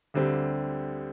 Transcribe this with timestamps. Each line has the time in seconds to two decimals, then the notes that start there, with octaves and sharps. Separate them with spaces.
0.14 D2 D3 G3 C4 G4